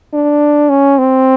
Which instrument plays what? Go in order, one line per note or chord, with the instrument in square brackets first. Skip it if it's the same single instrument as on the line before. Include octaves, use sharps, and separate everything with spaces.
[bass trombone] D4
C#4
C4